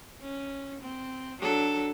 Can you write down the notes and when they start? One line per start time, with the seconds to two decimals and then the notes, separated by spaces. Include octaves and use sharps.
0.21 C#4
0.81 C4
1.40 F#3 D4 A4